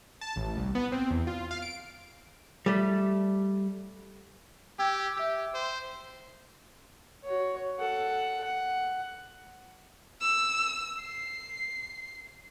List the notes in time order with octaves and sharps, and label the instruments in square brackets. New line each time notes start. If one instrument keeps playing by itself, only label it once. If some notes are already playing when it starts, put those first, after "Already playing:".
[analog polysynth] A5
A1
C2
B3
C4
E2
F4
F5
D7
[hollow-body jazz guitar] G3 A3
[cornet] G4 [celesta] G5 E6 G#6
[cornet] G4 [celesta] E5 E6
[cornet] C5
[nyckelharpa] F#4 C#5
A4 F#5
F#5
[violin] E6
C7